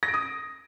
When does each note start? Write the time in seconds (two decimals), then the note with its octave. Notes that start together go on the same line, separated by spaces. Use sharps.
0.03 A#6
0.08 D7
0.14 D#6